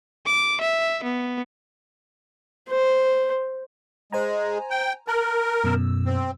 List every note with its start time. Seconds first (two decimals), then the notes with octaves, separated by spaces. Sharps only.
0.26 D6
0.61 E5
1.04 B3
2.70 C5
4.12 G#3 C5 G#5 A#5
4.70 G5
5.07 A#4 A5 F#6
5.64 F#2 B2 E6
6.06 C4